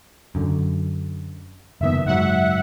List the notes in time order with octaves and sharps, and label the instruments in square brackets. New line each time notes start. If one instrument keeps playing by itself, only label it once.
[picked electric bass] F#2 D3
[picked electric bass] F#1 D#3 B3 [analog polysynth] E5
[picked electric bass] F#1 G#2 F#3 [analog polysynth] E5 F#5